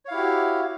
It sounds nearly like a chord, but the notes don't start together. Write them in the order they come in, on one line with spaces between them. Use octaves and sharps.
C#5 F5 E4 G4 F#4